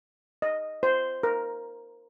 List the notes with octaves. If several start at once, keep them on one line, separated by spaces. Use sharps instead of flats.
D#5
C5
A#4